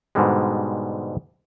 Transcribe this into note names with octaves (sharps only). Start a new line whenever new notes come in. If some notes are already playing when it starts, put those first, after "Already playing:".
G#2 B2 D3 G3 G#3